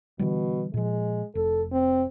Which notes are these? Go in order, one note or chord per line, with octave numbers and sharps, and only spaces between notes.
B2 D3 E3 G3
A#2 F3 G#3
F1 A4
C4